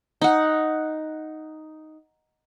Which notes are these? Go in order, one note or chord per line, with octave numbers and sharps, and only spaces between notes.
D#4 F#5